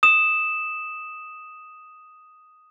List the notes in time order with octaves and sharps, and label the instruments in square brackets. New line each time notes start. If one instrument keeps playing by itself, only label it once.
[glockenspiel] D#6 E7